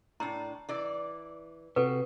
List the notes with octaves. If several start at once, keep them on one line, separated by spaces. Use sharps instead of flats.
A2 D4 A#5
E3 D5
C3 F#4 A4 B4